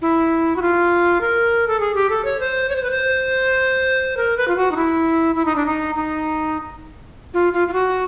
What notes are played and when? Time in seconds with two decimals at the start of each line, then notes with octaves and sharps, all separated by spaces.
0.02 E4
0.56 F#4
0.62 F4
1.21 A#4
1.68 A4
1.80 G#4
1.95 G4
2.10 A4
2.25 C#5
2.40 C5
2.69 C#5
2.76 C5
2.83 B4
2.90 C5
4.17 A#4
4.37 B4
4.48 F4
4.56 F#4
4.71 D#4
4.76 E4
5.35 E4
5.45 D#4
5.56 D4
5.66 D#4
5.95 D#4
7.34 F4
7.53 F4
7.68 F4
7.73 F#4